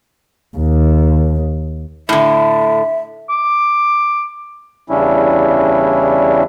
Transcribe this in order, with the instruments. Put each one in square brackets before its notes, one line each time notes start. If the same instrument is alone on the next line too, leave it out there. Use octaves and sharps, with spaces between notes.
[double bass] D#2
[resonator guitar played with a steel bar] A2 D3 [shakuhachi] E5
[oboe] D6
[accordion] E2 C#3 G3 C#4 D4 E4